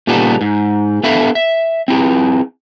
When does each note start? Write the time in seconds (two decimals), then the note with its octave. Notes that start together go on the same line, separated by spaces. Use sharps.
0.07 A#2 C#3 G3 B3 D#4 A4
0.41 G#2
1.03 B3 D4 A4 E5 F5 B5
1.35 E5
1.88 C4 E4 G#4